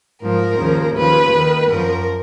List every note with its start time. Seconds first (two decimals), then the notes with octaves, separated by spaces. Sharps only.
0.21 G#2 F3 A#4
0.59 D#2 C#3 F3
0.95 D#2 C#3 F3 B4
1.32 D#2 D#3
1.69 F#2 F3 A#4